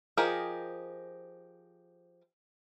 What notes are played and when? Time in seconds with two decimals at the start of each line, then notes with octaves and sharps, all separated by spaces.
0.17 F3 G4 G#4 A#4 D#5